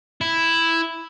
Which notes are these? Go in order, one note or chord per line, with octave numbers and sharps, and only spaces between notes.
E4